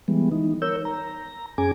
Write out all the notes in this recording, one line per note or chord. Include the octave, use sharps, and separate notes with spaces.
E3 G3 G#3 B3
E3 D#4
A#4 C#5 E6 G6
A#5
F#2 C#4 G#4 G#5 D6